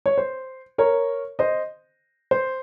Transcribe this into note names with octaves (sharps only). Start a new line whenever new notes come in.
C#5
C5
A#4 C#5
C5 D#5
C5